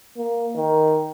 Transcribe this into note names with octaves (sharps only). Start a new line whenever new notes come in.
A#3
D#3